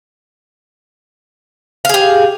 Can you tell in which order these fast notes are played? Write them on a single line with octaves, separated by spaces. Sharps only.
F5 G#4 G4